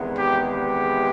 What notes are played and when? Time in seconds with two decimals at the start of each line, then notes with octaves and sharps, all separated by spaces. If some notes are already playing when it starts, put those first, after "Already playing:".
Already playing: E2 C3 D#3 G#3 B3
0.18 G4
0.48 G4